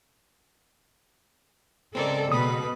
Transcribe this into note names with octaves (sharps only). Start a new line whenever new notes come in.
C#3 G#3 C4 A4 A#4 D5
B2 B4 B5 D#6